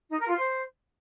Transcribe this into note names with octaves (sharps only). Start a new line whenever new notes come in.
D#4
A#4
F4
C5